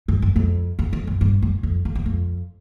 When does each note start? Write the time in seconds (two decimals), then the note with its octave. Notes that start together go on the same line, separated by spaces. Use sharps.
0.08 G2
0.22 F#2
0.36 F2
0.79 E2
0.93 F2
1.07 F#2
1.21 G2
1.42 F#2
1.63 F2
1.85 F2
1.95 E2
2.06 F2